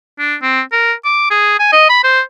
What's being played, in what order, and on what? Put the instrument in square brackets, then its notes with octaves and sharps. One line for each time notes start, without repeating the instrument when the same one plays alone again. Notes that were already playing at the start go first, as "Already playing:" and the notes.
[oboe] D4
C4
A#4
D6
G#4
G#5
D#5
B5
C5